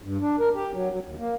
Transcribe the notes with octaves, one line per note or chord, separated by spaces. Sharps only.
G2
D4
A#4
G4
F#3
F#3
D#2
A#3